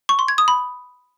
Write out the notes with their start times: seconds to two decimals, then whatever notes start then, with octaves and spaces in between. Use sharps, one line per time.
0.09 C#6
0.19 C6
0.28 G#6
0.38 D#6
0.48 B5